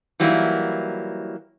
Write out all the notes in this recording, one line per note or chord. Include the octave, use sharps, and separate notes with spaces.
E3 F#3 G3 A#3 D#4 E4